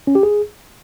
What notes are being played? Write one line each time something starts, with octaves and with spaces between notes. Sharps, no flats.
C#4
G4
G#4